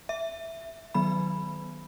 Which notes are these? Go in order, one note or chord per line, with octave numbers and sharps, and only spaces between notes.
E5
D#3 F#3 B3 B5